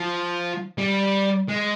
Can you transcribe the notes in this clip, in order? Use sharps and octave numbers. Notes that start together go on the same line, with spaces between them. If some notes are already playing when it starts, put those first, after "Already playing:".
Already playing: F3
G3
G#3